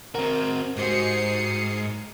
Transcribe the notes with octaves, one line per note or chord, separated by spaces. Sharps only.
C4 F#4 A#4
G#2 F#4 G4 C5 D#6 C7 C#7